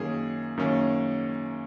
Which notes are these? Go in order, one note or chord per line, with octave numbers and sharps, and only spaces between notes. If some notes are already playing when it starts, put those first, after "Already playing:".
Already playing: F#2 D#3 A#3 C#4 G#4
F#2 D#3 A#3 C#4